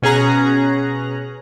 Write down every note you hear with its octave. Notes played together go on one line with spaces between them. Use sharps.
B2 C#4 G#4 A#5 F#6